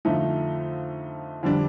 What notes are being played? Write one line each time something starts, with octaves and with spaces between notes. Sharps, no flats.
F2 D3 F3 A3 D#4
F2 D3 G3 D4